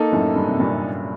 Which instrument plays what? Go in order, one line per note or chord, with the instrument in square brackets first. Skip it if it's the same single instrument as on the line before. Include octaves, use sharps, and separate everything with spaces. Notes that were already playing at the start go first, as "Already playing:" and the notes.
Already playing: [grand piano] A#3 D#4 A4 D#5
[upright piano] F#2 A2
G2
C3
G2 A#2